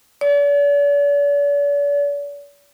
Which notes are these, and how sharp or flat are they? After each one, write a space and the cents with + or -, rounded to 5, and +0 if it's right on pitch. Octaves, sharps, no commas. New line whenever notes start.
D5 -45